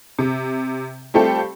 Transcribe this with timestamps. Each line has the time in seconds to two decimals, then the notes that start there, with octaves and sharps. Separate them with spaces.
0.19 C3
1.14 G3 A3 C4 F4 G4 A4